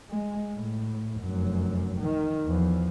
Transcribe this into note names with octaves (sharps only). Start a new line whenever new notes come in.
G#3
A2
F1 F#2
D#3
E2 F3